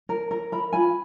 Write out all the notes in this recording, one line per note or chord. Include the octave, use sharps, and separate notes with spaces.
A#4
A#4
A#4 B5
F4 G#5 B5